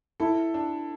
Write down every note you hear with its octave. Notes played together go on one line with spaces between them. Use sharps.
E4 A4
D4